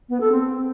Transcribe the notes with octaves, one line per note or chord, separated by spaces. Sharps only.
B3
A4
C4